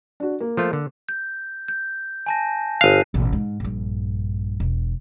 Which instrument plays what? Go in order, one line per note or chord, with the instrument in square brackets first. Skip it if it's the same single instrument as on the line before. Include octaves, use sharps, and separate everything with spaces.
[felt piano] D4 F#4
A#3
[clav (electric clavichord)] F3 A3 F4
D3
[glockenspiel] G6
G6
G#5 A5 A#6
[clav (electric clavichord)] G1 F5 [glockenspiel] F#6 C7 D#7
[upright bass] A1 B2
G#2
A#1 G2
E1